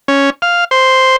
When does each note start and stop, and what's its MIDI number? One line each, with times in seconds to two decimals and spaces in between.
0.08 0.30 61
0.42 0.64 77
0.71 1.16 72